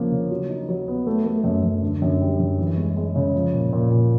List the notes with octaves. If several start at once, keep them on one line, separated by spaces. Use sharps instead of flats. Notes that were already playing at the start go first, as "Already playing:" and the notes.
Already playing: C#3 F3 A#3
C#3
F#3
D#4
F#3
B3
A3
A3
F#2
F#2
D3
F#2
G3
F#2
E3
G#3
G#3
C#3
F3
A#2
A#2
A#2